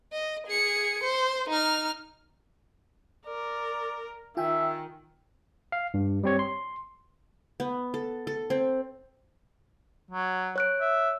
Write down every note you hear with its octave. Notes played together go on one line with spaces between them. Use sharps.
D#5
G#4 C#7
C5
D#4 F6
A#4 D5
D#3 F4 E5 G5 G#5
F5
G2
G3 C4 C#5
C6
B3
A4
A4
C4
F#3
C#5 F#6 D7
E5